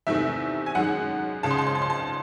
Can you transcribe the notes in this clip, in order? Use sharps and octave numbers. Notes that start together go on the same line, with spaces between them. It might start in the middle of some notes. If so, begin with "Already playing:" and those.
E2 C3 D#3 A3 E5
G#5
F#2 D#3 G#3 F#5
C#2 C#3 G#3 A5
C6
A5
C6
A5
C6
A5